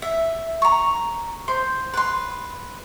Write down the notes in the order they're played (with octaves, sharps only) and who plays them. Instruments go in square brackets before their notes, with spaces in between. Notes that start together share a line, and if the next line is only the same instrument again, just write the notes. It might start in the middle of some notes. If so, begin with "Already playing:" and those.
[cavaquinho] E5
A#5 C#6
C5
B4 C6